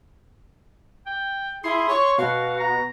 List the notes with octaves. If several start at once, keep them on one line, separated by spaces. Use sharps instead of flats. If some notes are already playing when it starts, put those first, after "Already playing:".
G5
E4 G#4 C6
C#5 C#6
B2 F#4 F5
A#5